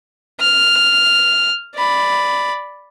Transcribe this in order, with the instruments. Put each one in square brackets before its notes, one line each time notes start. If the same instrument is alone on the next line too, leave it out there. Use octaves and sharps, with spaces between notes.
[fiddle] F6
D5 B5